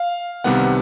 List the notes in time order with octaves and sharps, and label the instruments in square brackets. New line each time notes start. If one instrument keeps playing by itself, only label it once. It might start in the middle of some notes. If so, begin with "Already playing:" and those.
Already playing: [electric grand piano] F5
C2 C3 D#3 G3 B3 F#5